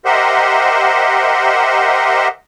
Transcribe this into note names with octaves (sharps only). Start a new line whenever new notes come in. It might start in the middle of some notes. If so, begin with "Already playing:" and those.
G4 A#4 C5 D#5 E5 F#5